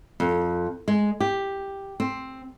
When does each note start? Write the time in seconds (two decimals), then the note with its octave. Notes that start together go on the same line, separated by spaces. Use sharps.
0.20 F2
0.88 G#3
1.20 G4
2.00 C4